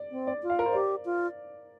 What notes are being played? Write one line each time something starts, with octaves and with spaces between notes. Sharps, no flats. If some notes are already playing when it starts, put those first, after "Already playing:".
Already playing: D5
C4
D5
F4
F5
A#4
C5
G4 D5
F4